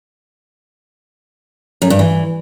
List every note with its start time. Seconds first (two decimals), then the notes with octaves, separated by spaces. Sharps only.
1.82 F#2
1.90 G2
1.99 E3